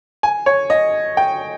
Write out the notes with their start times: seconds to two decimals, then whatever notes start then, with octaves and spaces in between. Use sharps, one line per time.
0.23 G#5
0.46 C#5
0.70 D#5
1.17 G5